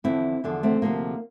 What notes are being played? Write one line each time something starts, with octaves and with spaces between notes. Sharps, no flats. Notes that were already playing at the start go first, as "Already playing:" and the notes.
E2 D3 F3 C4 E4
E2 D3 F3
A3 C4
D2 C3 F3 A3 A#3